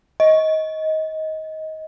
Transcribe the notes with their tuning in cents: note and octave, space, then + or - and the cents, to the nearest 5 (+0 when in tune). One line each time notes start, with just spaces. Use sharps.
D#5 +20